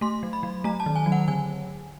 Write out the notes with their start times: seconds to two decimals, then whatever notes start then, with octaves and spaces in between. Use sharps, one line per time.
0.01 A3 C6
0.23 F#3
0.33 B5
0.43 F#3
0.64 A3 A#5
0.80 A5
0.86 D#3
0.95 G#5
1.06 F#3
1.12 F#5
1.28 D3 G#5